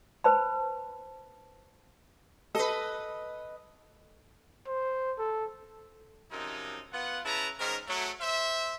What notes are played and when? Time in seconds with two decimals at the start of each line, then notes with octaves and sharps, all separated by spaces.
0.24 B4 C5 A5 B5
2.55 A4 B4 D#5
4.67 C5
5.18 A4
6.30 F#2 C3 F3 D#4
6.92 B3 F4 F#5
7.24 C#3 E4 B4 A5 A#5
7.58 G#2 D#3 C#4 A#4
7.87 F#3 A3
8.20 C5 E5